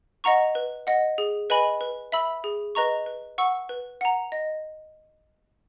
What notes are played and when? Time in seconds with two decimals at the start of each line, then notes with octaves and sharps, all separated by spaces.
0.24 D#5 F#5 A#5 C#6
0.55 B4
0.87 D#5 F#5
1.18 G#4
1.50 B4 D#5 G#5 B5
1.81 B4
2.12 E5 B5 E6
2.44 G#4
2.75 B4 D#5 A#5 C#6
3.06 B4
3.38 F#5 C#6 E6
3.69 B4
4.01 F#5 A#5
4.32 D#5